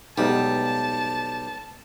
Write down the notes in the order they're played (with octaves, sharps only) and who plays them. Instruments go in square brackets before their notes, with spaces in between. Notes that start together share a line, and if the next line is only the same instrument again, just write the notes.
[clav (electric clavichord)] B1 [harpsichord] G3 [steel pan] G#3 B3 D#4 [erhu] A5